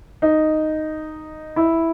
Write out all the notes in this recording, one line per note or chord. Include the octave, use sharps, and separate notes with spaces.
D#4
E4